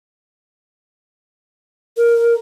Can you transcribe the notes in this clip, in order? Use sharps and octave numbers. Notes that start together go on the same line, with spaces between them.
A#4